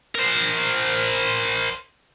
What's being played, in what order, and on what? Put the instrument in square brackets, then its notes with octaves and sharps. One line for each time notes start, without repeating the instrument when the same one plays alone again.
[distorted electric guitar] A#4 C5